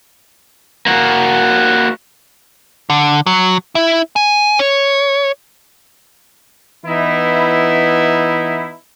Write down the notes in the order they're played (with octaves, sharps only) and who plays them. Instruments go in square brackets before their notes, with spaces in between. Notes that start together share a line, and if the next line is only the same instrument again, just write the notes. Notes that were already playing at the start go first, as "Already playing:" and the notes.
[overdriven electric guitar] A#3 F#4
[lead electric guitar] D3
F#3
E4
G#5
C#5
[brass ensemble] E3 B3 D#4 E4